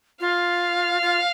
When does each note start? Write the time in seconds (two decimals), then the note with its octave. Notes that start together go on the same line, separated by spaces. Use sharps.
0.20 F4 F5
1.02 F4